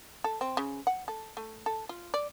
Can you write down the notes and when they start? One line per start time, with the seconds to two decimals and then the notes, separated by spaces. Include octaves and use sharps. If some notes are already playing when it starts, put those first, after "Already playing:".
0.24 A4
0.41 C4
0.57 C#3
0.87 F#5
1.08 A4
1.37 A3
1.66 A4
1.89 F4
2.14 D5